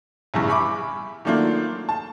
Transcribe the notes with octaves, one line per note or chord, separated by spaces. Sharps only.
A#1 E2 G2 C#3
E5 G#5 B5 C#6 D6
D#3 F#3 A3 A#3 D4 F4
A5